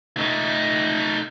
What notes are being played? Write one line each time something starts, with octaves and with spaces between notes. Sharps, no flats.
A3 D#4